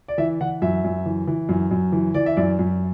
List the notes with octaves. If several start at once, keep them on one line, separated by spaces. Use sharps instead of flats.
D5
E3 E5
E3 F#5
F#2 E5
F#2
E3
E3
F#2
F#2
E3
E3 D5
E5
F#2 D5
F#2